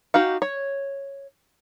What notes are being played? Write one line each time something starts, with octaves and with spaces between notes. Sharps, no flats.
D#4 F#4 G4 F5
C#5